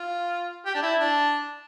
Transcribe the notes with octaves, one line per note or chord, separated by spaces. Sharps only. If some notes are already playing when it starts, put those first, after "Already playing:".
Already playing: F4
G4
D4
E4
D4